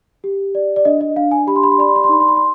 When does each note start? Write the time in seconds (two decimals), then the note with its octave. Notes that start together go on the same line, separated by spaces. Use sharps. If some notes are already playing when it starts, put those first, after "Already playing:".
0.24 G4
0.55 D5
0.76 D5
0.85 D4 D#5
1.01 D#5
1.16 D4 F5
1.31 G#5
1.47 G4 B5
1.56 C6
1.63 B5
1.72 C6
1.78 D5 B5
1.88 C6
1.96 B5
2.04 C6
2.09 D#4 B5
2.20 C6
2.28 B5
2.36 C6